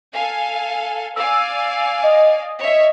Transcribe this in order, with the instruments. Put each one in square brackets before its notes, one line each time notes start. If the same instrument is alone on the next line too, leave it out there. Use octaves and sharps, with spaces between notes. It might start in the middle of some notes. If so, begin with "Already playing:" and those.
[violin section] A4 F5 G#5
[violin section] D5 F5 G#5 [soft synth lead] E6
[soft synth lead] D#5
[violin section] C#5 E5